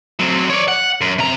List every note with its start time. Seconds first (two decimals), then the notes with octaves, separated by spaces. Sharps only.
0.20 F#3 C4
0.50 C#5 D5
0.68 F#5
1.01 F#2
1.19 C3 A#5